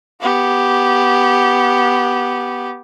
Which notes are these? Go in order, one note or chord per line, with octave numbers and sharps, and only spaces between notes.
B3 G4